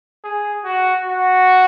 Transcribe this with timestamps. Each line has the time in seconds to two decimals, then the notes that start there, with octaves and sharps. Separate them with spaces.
0.24 G#4
0.64 F#4
1.05 F#4